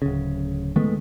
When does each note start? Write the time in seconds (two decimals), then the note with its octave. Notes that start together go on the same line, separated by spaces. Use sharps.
0.02 D1 C#3
0.76 D#3 G#3 A3 B3